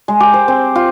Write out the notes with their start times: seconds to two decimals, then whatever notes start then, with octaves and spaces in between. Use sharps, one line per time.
0.08 G#3
0.20 G4
0.34 C5
0.48 C4
0.75 F4